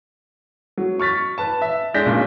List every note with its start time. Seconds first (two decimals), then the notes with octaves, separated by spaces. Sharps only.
0.78 F#3
1.00 C#6 F6 A6 B6
1.38 B4 A5
1.62 E5
1.94 G#3 D4 G6 A#6 B6
2.06 B1 A#2 C#3